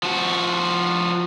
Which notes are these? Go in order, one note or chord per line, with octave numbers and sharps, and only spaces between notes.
F3 F#4